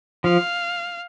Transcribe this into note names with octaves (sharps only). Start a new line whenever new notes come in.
F3 F5